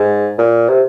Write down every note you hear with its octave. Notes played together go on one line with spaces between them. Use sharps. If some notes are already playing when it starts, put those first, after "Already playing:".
Already playing: G#2
A#2
C3